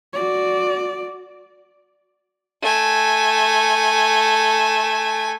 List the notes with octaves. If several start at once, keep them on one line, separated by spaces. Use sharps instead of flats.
F#4 D5
A3 G#5